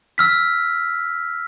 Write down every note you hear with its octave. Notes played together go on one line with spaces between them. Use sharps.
E6 F6 B6